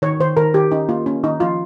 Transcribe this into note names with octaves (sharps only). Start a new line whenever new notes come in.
D#3 C#5
D#3 C5
D#3 A#4
D#3 G4
C#4 D#4
A#3 F4
A#3 C#4
D#3 D#4
F3 F4